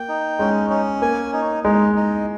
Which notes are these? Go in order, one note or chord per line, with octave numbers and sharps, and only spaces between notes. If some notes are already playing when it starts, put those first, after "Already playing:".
Already playing: A#3 G5
D#4
G#3 C#4
C#4
A#3 G#5
D#4
G#3 D#4
D#4